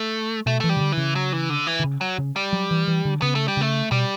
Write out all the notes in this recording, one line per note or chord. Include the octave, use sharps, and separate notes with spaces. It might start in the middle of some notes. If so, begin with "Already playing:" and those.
Already playing: A3
B2 A3
E3 A3
G3
C#3
D3
E3
C#3
F#3
E3
D3
E3
D3
C#3
F#3
C#3
G3
F#3
E3
E3
D3
C#3 B3
A3
G3
C#3 A3
B2 G3